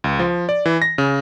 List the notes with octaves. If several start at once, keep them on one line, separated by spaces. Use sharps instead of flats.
C#2
F3
D5
E3
A#6
C#3